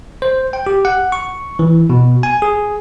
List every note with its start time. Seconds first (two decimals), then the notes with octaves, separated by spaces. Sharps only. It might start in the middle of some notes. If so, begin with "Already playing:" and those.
0.22 C5
0.53 G5
0.67 G4
0.85 F#5
1.12 C#6
1.59 E3
1.90 B2
2.23 G#5
2.42 G#4